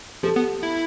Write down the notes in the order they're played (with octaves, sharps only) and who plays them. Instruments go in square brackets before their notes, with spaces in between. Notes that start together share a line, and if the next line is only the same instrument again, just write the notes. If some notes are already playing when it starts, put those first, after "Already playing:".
[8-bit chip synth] F3 [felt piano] G4 A4
[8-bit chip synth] B3
E4